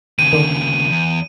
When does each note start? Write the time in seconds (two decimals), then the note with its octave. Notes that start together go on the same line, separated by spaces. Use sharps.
0.19 D#2 C#3 D#7
0.33 D3 D#3
0.90 E2